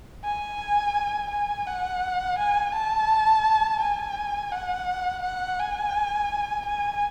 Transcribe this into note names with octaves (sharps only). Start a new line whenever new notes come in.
G#5
G#5
F#5
G#5
A5
G#5
F#5
F#5
G#5
G#5